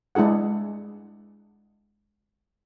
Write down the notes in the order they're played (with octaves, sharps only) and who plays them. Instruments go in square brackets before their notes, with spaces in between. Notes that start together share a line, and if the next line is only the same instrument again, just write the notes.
[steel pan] G#3 D4 E4 G#4 F#5